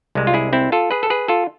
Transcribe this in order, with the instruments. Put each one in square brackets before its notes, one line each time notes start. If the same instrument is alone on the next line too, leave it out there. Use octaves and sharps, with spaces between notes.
[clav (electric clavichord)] C2 C3 G#3
F4
E4 G#4
C4 E4
F4 A4
G#4 B4
A4
G#4 B4
F4 A4